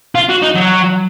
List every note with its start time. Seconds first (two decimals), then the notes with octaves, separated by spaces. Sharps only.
0.15 F4
0.29 F#4
0.43 D#4
0.56 F#3